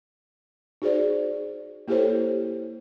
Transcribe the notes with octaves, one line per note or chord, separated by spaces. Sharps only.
D#4 F#4 G#4 C5 D5
A#3 E4 G4 A4 C5 C#5